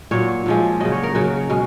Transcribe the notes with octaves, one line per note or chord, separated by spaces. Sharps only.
A#2 F#3 C#5
A#2 F3 G#3
C#3 F#3 D#5
C#5
A#4
C#3 F#3 F#4
B2 G#3